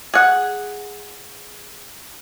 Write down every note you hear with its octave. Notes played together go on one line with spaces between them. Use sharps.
G#4 F#5